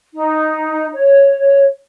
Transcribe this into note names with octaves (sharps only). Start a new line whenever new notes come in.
D#4
C#5